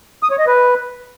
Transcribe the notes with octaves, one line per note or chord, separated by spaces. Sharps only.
D#6
C#5
D#5
B4